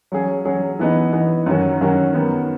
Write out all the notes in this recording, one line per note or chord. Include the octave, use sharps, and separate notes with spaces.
F#3 C#4 G#4
F#3 C#4 G#4
E3 B3 D#4
E3 B3 D#4
F#2 D#3 F#3 C#4 F#4
F#2 D#3 F#3 C#4 F#4
D#3 F#3 B3